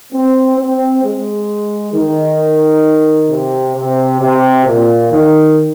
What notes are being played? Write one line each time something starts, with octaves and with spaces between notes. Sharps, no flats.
C4
C4
G#3
D#3
C3
C3
C3
A#2
D#3